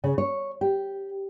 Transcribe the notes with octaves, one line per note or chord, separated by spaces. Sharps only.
C#3
C#5
G4